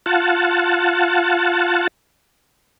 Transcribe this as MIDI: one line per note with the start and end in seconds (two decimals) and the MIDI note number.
0.06 1.87 65
0.06 1.87 78
0.06 1.87 81